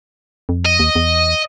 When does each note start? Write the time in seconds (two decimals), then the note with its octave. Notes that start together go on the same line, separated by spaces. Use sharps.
0.49 F2
0.66 D#5
0.80 D#2
0.96 E2